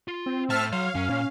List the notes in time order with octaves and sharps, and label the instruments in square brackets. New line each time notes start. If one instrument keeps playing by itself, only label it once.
[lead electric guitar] F4
[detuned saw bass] C4
[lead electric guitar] A2 [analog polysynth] E5 A5 F6
[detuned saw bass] F#3 [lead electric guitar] C#5 C6 [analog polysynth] F5
[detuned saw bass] F#2 [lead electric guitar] C#4
[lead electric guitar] A#2 [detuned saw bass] C#4